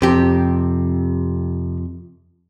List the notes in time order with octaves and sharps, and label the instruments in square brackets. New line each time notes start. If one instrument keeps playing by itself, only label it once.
[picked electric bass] F2 [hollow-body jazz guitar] C3 G4